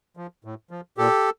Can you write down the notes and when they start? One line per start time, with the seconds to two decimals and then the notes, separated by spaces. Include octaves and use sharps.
0.17 F3
0.44 A2
0.71 F3
0.97 A#2 G4 A4